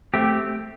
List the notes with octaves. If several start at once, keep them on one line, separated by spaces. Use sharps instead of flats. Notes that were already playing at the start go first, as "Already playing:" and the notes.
A3 C4 G4